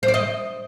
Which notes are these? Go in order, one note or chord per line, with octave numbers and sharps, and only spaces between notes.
C5
D5
D#5